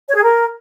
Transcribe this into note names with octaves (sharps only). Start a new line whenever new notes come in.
C#5
G#4
A#4